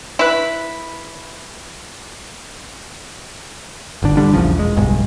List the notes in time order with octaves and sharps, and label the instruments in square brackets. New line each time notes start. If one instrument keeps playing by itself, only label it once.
[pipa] E4 B4
[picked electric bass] G1 D3
G1 D3 G3 D4
A#1 E2 C#3 F3
E1 G#3
D1 B1 G2 G#3